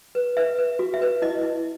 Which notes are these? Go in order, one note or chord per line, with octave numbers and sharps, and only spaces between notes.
B4
B4 E5
B4
F#4
E5
B4
E4 D#5
E4